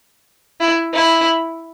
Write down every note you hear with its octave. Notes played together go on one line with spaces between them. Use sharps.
E4
E4